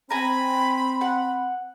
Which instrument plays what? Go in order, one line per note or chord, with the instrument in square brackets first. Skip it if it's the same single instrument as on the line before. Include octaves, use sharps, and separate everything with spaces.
[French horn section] C4 [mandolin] G#5 A#5 [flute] B5
[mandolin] F#5